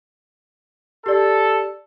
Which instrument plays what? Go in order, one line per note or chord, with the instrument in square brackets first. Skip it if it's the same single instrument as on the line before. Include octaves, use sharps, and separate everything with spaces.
[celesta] G4 D5 [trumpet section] A4